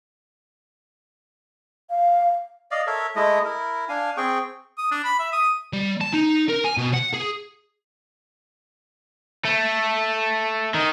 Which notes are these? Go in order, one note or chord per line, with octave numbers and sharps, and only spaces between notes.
F5
D5 D#5 F5
A4 A#4 C#5 E5
G#3 A3 E4 D#5
E4 A#4
D4 F5 G#5
C4 G#4 G5 C#6
D#6
D4
B5
E5
D#6
G3
A5
D#4
A#4
G#5
B2
F#5
G#4
A3
D#3